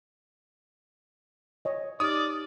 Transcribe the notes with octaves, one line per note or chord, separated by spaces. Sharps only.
C#5 D#5
D#4 G4 D5 D#6 F6